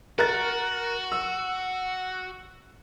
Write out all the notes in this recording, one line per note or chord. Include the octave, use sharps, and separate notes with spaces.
F#4 A#4 F#6 A6
E6